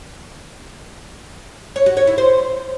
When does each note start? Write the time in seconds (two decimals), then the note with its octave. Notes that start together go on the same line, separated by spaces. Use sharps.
1.76 C#5
1.86 F#4
1.97 C#5
2.07 E4
2.18 C5